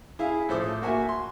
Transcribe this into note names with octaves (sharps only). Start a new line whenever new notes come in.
E4 G#4 F5
A2 F3 A4 C5 D6 D#6
A#3 F#4 E5 G#5
C6